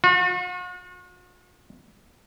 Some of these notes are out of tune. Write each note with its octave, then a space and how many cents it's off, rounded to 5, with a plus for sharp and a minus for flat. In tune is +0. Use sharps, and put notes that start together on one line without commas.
F#4 -45